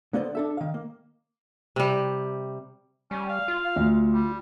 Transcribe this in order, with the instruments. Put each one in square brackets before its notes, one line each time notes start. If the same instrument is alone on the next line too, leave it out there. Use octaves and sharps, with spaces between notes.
[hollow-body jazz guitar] D3 A#3 B3 C5 D5 D#5
D4 A4 E5
D#3 F5
A#3
[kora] C3 G3
[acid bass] G3 [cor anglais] C#4
[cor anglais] F5
[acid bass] F4
[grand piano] D2
[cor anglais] G3